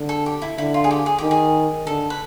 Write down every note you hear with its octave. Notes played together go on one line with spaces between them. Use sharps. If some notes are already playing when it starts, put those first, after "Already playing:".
Already playing: D3
A4
G4
E4
D3 E4
F4
G#4
G4
G#4
D#3 G4
G#4
D3 A4
B4